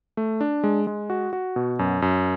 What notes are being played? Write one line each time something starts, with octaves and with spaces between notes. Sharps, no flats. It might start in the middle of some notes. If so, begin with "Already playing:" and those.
A3
D4
G#3
G#3
F#4
F#4
B2
F#2
F#2